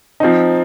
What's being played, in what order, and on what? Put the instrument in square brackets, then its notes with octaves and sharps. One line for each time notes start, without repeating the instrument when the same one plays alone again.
[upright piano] F3 C4 D#4